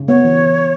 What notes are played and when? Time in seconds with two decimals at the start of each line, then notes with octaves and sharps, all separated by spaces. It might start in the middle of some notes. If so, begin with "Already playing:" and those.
Already playing: C#3
0.08 B3 C#5
0.25 E3